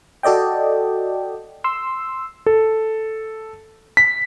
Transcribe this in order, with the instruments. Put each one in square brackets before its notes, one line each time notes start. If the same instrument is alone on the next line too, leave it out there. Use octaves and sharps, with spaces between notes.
[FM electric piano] F#4 A4 D5 D#5 G5
C6 E6
[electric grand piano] A4
B6